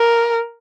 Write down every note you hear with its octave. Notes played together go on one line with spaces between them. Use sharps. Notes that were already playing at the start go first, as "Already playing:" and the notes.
Already playing: A#4